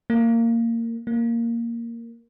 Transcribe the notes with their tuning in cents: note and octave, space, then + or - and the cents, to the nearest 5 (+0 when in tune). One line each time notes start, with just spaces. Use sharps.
A#3 -20
A#3 -5